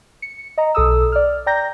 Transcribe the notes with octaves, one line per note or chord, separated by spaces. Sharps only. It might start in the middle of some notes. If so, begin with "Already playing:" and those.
C#7
D#5 A#5
B1 A4 D#6 E6
D5 F6
D5 G5 A#5 G6 A#6